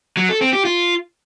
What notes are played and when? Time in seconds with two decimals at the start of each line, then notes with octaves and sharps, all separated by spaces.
0.17 F#3
0.29 A4
0.41 C4
0.53 G4
0.65 F4